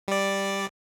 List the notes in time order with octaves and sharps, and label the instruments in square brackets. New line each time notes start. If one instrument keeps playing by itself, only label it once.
[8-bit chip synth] G3 D5